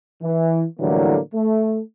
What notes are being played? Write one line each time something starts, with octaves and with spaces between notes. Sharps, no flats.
E3
A2 D3 E3 F#3 G3 A#3
A3